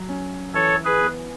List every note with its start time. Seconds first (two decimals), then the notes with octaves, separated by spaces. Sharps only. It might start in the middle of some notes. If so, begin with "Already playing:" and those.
Already playing: F#3
0.09 C#4
0.54 E3 A4 C#5
0.85 G#4 B4
1.00 B3